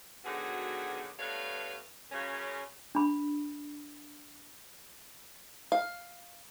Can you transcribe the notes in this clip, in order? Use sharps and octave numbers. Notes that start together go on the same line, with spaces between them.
B2 D3 D#3 F#3 F#4 G#4
G2 A3 B3 B4 C#5 F5
F#2 C#3 C#4
D4 B5
F5